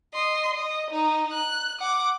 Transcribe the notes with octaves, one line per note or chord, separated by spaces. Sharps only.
D#5 C6
D#5
D#4
F#6
F#5 D6